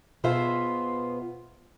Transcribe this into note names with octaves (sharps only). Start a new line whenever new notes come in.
B2 B3 F4 G#4 C5 E5